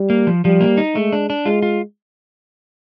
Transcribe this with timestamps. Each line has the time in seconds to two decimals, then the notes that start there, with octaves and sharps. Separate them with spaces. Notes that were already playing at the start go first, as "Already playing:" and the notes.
Already playing: G3
0.10 A#3
0.27 F3
0.45 F3 G3
0.61 A#3
0.78 D#4
0.95 G#3 A3
1.13 D4
1.30 D4
1.46 G#3 F4
1.63 F4